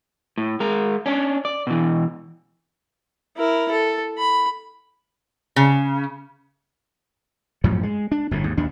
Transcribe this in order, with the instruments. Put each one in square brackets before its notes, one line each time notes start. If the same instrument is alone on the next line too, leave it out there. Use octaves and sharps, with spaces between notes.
[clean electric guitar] A2
G#3 A#4
C#4 D4
D5
B2 E3
[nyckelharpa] E4 A#4
A4
B5
[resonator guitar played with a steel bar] C#3
[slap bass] F#2 A2 F3 F#3
G#3
D4
G1 F2 A2
D#2 G#2
D#2 D4